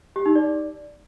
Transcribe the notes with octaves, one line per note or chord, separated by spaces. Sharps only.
G4
D#4
D5